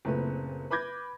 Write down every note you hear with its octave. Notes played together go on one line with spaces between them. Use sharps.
F#1 A#2 A3 C4 B4
B4 B5 D6 G6 G#6 A#6